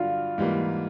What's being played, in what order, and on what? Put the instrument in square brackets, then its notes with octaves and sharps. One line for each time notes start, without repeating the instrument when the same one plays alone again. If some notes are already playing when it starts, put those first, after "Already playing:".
Already playing: [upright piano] G2 D3 F#3 [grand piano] F4
[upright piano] G#2 E3 G3 A#3